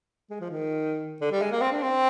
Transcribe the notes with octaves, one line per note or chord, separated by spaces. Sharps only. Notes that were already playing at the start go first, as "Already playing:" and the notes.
G#3
F3
D#3
D3
G3
G#3
A#3
C4
D4
C4